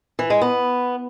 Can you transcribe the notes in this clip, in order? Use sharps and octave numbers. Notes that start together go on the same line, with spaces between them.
E3
G#3
B3